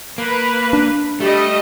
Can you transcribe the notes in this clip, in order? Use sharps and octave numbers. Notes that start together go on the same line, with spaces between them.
A#3 B4
D4
G3 A3 D#5